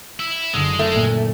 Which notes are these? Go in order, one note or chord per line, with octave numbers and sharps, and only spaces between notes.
E4
F#1 D3 G#3
A3
A#2